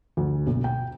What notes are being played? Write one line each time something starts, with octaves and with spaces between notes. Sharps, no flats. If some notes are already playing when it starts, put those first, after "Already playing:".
D2
B1
G5